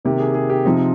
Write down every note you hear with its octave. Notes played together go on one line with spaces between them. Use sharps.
C3 D#3 A#3 G4
G#4
G#4
G4
C3 F3 C4 D#4